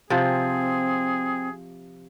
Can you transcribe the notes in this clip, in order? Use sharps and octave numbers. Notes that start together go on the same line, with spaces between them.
C3 F3 C4 G#4